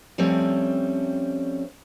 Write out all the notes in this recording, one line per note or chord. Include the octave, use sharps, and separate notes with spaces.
F3 G3 A3 C4 C#4 C#5